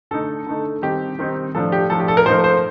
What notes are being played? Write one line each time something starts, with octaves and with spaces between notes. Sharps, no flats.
D3 A3 D#4 A4
D3 A3 D#4
D#3 G3 C4 D#4 G4
D#3 G3 C4 D#4
A2 F3 A3 D4 A4
G4
A2 F3 A3 D4 A4
G4
A4
A#4
A#2 F3 A3 D#4 C5
C5